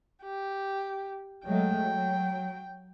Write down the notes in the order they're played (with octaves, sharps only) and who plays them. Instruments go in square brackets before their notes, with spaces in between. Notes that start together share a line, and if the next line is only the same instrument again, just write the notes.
[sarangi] G4
[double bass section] F#3 G#3 A3 [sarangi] G5
[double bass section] F#3